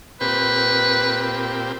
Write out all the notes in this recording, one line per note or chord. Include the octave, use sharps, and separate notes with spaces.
A#2 C4 G4 B4